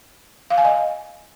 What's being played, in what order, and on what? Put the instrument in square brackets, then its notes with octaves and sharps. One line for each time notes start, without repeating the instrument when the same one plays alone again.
[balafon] F5
G#5
D#5